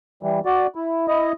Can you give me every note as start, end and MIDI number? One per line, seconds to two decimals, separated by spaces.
0.23 0.40 52
0.23 0.40 55
0.45 0.67 66
0.45 0.67 74
0.75 1.07 64
1.08 1.32 64
1.08 1.32 75